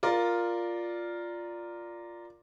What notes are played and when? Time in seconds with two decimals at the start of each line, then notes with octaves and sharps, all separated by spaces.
0.03 F4 A#4 D5